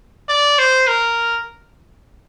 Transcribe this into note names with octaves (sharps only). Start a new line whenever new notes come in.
D5
C5
A#4